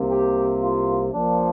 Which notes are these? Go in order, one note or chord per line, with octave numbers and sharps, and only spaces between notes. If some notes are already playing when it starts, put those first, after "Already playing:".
Already playing: C2 C3 A#3
G4
F4
A#1 A#2 F3 A#3 D4